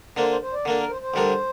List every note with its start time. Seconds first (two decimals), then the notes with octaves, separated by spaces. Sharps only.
0.17 D3 A#3 D4 C5
0.29 C5
0.42 C5
0.53 D5
0.65 D3 A#3 D4
0.78 A#4
0.90 C5
1.02 C5
1.14 D2 D3 G3 D4 A#4